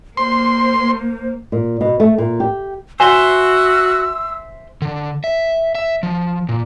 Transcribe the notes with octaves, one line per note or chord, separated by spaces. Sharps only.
A#3 C5 C6
C5
A#2
B2
A3
A#2
G4
F#4 C5 E5 G#5 C6 E6
D3
E5
E5
F3
A#2